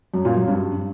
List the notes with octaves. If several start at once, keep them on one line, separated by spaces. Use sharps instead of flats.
F#2
A#2
F#2
G2